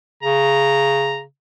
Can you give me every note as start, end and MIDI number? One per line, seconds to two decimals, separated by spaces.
0.23 1.24 49
0.23 1.21 82